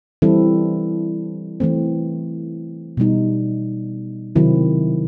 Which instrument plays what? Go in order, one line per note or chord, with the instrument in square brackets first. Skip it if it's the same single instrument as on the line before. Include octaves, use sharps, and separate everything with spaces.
[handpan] E3 G3 C4 E4 A4
E3 A3 C4
B2 G3 D#4
C3 D#3 F#3 C4 E4